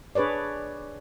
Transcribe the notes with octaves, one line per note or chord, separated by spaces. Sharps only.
D4 G#4 B4 C#5 D5